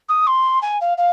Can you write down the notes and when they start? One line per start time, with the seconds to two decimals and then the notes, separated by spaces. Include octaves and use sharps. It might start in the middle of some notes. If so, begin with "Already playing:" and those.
0.09 D#6
0.27 C6
0.62 G#5
0.81 F5
0.98 F5